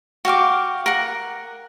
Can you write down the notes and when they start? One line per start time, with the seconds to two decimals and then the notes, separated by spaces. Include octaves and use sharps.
0.25 F#4 G4 F5 D6
0.86 A#4 F#5